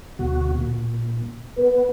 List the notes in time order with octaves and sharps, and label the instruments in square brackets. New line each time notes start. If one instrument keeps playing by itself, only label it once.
[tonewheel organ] D2 B2 F#4
A#2
[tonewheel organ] B3 [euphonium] B4